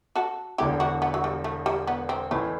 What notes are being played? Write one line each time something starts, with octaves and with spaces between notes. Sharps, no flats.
F#4 A4
E1 E2 D3 E4 G4
D4 F#4
B3
F#3
G3
A3
G3
B3
C4
A1 A2 E3 A3